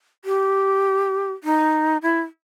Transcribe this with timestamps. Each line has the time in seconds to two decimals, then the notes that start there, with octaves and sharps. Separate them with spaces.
0.25 G4
1.44 D#4
2.02 E4